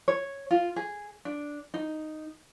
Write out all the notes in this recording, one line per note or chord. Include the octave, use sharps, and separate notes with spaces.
C#5
F4
G#4
D4
D#4